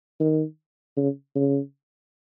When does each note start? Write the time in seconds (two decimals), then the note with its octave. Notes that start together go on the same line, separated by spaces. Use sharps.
0.20 D#3
0.97 C#3
1.35 C#3